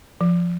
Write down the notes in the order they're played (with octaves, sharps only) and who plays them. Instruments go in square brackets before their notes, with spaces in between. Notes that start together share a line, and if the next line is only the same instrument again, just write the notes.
[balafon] F3